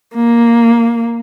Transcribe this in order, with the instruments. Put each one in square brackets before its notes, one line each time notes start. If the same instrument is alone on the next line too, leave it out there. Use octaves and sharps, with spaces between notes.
[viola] A#3